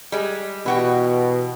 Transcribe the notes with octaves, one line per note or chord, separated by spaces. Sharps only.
G3 G#3
B2 E3 F#4 G4